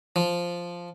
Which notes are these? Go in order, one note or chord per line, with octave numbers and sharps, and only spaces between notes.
F3